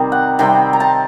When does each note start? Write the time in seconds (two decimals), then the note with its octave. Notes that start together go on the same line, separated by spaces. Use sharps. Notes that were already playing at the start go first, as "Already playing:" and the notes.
Already playing: C3 D#3 G3 C4
0.12 F#5
0.39 C3 D#3 G3 C4 G5
0.73 A#5
0.80 A5